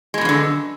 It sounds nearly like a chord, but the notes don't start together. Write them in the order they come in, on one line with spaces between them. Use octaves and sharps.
G#3 B2 F#2 F3 D3